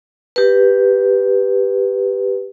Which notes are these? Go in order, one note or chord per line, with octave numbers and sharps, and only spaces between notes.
G4 B4